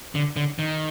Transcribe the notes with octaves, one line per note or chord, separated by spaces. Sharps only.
D3
D3
D#3